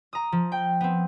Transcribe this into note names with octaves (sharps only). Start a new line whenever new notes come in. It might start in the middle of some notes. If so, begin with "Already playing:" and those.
A#5 D#6
F3
G5
B3 C4